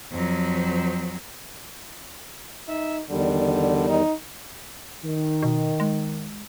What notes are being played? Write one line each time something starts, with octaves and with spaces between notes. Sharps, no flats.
F2 F#3
D#4 E5
E2 D3 D#3 G3
D#4
D#3
B2
G#3